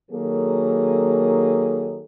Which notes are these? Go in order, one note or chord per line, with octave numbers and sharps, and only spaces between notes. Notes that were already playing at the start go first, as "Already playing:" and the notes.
D#3 F#3 A#3 G#4 A4